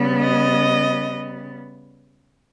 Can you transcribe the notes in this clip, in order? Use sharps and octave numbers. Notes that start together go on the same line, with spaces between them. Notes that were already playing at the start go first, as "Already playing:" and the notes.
Already playing: C#3 G3 B3
D#5